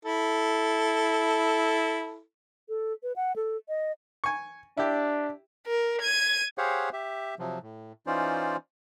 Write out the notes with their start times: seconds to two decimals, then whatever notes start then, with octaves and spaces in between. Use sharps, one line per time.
0.05 E4 A4
2.69 A4
3.03 B4
3.16 F#5
3.36 A4
3.69 D#5
4.24 G#5 C#6
4.77 D4 E4 G4
5.67 A#4
6.02 G#6 D#7
6.58 G4 G#4 C5 C#5 F5 F#5
6.93 G4 E5
7.39 C3 F3 F#3
7.63 A2
8.07 E3 C#4 D#4 F4 C5 D5